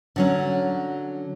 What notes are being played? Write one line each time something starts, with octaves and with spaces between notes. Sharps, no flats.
D3 F#3 C#4